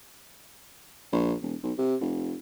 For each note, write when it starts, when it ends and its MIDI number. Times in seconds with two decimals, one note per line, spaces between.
1.12 1.34 34
1.42 1.55 28
1.63 1.72 35
1.78 1.96 48
2.01 2.36 29